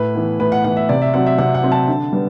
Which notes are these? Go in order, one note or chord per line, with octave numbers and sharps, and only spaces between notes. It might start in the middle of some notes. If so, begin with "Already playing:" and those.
Already playing: A2 B4
E3 B3
A2 B4
F#5
E3 B3 F#5
E5
C3 D5
E5
F#3 C4 F#5
E5
C3 F#5
F#5
F#3 C4
A5
D3
G3 B3